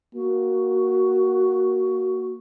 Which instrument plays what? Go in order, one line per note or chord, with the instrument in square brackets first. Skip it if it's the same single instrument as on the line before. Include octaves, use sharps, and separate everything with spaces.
[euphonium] A#3 [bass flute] F#4